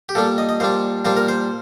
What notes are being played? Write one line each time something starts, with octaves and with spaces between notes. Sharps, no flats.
G4
A#2 G3 D4 A4
D#5
D#5
A#2 G3 D4 C5
A#2 G3 D4 C5
A#4
C5